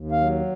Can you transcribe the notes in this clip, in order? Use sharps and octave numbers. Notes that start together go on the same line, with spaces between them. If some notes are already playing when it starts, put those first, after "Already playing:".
Already playing: D#2
F5
F#3